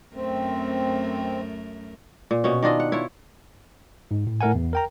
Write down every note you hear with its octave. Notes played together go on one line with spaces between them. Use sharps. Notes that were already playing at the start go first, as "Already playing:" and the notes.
F#2 A3 C4 A#4
A#2
B2 C#4
D#3 D4 F4 D#5
F#5
E4 F4 C#5
G#2
A2
A2 A3 A#4 F#5 G#5
E2
A#4 G5 A#5